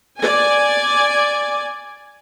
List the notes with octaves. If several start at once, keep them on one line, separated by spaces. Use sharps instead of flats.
D5 G#5